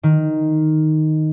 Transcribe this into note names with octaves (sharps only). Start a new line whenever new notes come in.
D#3